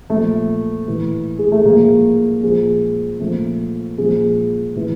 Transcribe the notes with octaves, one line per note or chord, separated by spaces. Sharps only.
A#2 F3 A3
A2 E3
G#3
A3
A2 F3 G#3 A#3
A#2 F3 G#3
A#2 F3 A3
A#2 F3 G#3
A2 E3